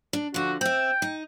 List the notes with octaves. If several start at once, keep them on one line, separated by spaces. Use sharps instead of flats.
D4
D3 F3 F#4
C4 E5 G5
D#4